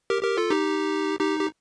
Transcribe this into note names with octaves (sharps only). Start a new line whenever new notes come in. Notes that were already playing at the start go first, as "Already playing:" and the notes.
G4 A#4
G4 A#4
F4 A4
D#4 G4
D#4 G4
G4